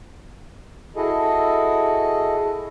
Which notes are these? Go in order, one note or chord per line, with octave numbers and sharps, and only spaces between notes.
E4 F#4 G#4 A4 D#5